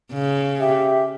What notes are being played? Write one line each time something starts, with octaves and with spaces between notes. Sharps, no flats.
C#3
G4 E5